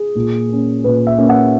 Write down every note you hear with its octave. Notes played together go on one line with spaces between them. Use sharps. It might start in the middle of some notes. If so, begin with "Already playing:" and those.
Already playing: G#4
A#2
A#3 C#4
A#2 B4
E5
A#3 C#4
F#5